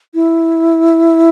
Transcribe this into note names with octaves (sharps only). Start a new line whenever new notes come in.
E4